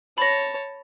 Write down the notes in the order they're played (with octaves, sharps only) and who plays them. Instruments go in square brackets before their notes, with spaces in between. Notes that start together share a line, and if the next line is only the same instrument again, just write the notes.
[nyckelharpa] C#5 A5 [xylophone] B5 A#6